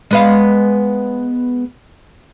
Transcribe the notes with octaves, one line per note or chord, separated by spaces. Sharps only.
G#3 B3 F5